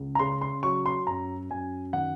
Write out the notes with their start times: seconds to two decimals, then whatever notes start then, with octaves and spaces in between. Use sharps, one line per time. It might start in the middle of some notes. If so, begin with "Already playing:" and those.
Already playing: C#2
0.15 A#5
0.19 C#3 C6
0.41 C6
0.63 F#3 C#6
0.86 C6
1.07 F#2 A#5
1.50 F#2 G#5
1.93 D#3 F#5